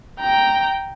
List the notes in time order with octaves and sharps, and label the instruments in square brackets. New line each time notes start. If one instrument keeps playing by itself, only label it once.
[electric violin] G5 A#5